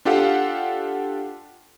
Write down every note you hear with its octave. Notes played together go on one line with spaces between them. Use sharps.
D4 F4 G4 A4 F5 F#5